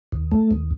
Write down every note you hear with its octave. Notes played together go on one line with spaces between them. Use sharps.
D#2
A3
D#2